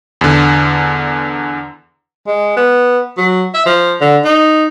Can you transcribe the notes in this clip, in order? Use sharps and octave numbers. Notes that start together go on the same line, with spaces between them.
E2 D3
G#3
B3
F#3
E5
F3
D3
D#4